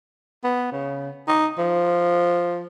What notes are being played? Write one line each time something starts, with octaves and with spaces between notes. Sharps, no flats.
B3
C#3
D#4
F3